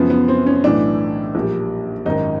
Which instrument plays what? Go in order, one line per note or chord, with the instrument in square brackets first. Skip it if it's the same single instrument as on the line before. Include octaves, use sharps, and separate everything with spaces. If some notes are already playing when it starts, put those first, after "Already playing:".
Already playing: [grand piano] F#2 C#3 F3 B3
B3
C4
C#4
B1 A2 E3 A3 D4
A#1 A#2 G3
G#1 F#2 D#3 D#4